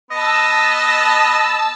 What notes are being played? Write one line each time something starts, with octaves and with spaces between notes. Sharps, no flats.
B3 D#5 A5 E6